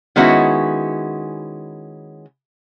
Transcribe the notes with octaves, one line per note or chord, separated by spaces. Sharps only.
D#3 G#3 B3 C#4 E4 F#4